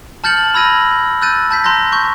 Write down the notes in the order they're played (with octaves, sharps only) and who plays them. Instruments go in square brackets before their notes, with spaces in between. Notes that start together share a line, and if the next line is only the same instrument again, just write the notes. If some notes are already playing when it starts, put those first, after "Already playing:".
[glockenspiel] A5 F6 G6 A6 C#7 F#7
B5 E6 G#6 A#6 D#7
E6 F#6 G6 A6 D#7
A5 G6 B6
A#5 C6 F#6 G6 A#6
C#6 G6